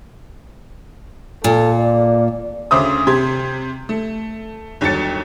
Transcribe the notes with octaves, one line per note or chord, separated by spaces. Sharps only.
A#2 A4
D5
D2 C#3 C5 E5 D6 D#6
C3 G4 C6 G#6
A3
G1 D#2 F#3 A6 C#7